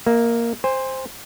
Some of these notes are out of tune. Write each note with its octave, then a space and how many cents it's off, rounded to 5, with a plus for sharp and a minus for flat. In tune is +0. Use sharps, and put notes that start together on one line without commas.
A#3 +0 E5 -40
C5 +0 G#5 -40